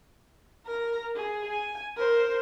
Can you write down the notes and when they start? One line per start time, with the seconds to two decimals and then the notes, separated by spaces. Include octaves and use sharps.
0.66 A#4 A#5
1.16 G#4
1.51 G#5
1.97 A#4 C5